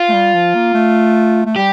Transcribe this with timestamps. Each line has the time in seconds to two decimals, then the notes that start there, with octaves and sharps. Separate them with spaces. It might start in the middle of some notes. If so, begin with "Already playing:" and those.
Already playing: F4
0.09 A3
0.14 G3
0.34 F3
0.54 A#3
0.74 A3
1.46 A3
1.56 G3 G4